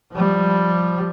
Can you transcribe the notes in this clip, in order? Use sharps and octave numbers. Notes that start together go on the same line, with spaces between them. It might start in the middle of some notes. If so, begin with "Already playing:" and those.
F3 G3